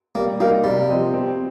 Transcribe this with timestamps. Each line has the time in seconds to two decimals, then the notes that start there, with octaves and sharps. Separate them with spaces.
0.15 G3 A#3
0.40 A#3 D#4 G4 A#4 F5
0.64 C3 G3
0.89 F3 C4 G4 D#5
1.13 C4